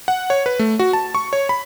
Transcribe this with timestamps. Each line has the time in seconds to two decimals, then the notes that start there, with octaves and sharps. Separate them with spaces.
0.08 F#5
0.30 C#5
0.46 B4
0.59 A3
0.79 F#4
0.93 A5
1.15 C#6
1.33 C#5
1.49 B5